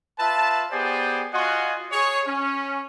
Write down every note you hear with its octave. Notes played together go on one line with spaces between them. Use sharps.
F4 B4 E5 A5
B3 G4 G#4 C5 D5 G#5
F4 F#4 D#5 F#5 G#5 C6
G#4 C#5
C#4